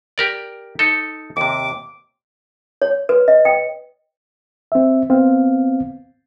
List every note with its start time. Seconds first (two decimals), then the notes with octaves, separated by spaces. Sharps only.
0.18 G4 A#4 D5
0.79 D#4 A4
1.37 D#2 C3 D6
2.82 C#5
3.09 B4
3.28 D#5
3.45 G5
4.72 C4 E5
5.10 B3 C4 F5